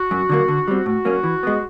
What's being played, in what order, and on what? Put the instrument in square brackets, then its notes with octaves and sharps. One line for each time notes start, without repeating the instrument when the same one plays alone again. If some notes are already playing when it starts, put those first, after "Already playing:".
Already playing: [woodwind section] F#4
[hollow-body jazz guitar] F#2
D3 F#3 A#3
D3
G3 C4
[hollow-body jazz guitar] A2 [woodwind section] F#4
[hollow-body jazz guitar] F#3 A#3 C#4
E3
G#3 B3